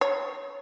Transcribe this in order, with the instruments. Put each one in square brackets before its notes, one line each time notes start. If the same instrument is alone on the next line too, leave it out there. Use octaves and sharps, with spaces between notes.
[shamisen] C#5